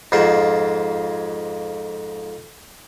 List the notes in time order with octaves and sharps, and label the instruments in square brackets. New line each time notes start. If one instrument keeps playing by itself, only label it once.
[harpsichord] F2 G#2 F4 C5